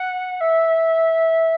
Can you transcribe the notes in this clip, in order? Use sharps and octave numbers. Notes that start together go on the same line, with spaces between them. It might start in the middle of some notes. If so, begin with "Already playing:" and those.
Already playing: F#5
E5